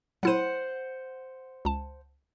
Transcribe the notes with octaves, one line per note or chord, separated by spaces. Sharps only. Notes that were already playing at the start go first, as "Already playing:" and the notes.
F#3 E4 C5 F#5 D#7
C#2 A5